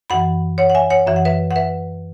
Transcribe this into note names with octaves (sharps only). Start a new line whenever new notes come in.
F#2 E3 F#5 B5
C#5 F#5
F#5
E5 G#5
C#5 F#5
F#2 E3 E5
F#5
B4 E5
F#5
B4 E5